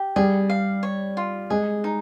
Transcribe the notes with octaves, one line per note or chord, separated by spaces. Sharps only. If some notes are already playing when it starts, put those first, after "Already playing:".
Already playing: G4
G3 G#4
F5
C#5
F4
G#3 G#4
D#4